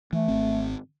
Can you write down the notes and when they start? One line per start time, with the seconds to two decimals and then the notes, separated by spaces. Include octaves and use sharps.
0.13 E3 A3
0.28 G#1 C4